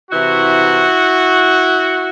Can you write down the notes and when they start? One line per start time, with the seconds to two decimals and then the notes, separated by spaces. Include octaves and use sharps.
0.11 C3 E3 E4 F#4